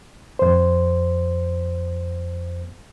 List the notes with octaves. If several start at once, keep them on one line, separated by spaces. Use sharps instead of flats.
F2 C5